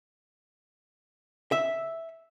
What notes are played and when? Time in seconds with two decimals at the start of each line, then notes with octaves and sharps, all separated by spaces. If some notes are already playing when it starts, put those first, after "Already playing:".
1.52 E5